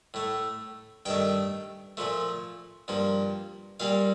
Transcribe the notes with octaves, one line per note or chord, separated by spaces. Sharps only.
A2 A3
G2 D#3 A3 G5
A#2 F3 A3
G2 F3 A#3
A#2 G3 A#3 F5